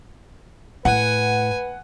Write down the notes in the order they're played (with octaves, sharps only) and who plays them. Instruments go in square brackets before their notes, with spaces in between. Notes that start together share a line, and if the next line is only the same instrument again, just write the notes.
[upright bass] A2 [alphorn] B4 [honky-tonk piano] F#5 [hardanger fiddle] G#5